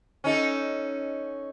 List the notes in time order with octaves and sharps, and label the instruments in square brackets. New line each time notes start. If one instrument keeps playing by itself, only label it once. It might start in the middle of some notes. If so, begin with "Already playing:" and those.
[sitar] C#4 D#4 A4